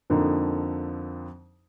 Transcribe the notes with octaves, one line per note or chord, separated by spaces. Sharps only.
F2 D3 F3 A#3 D#4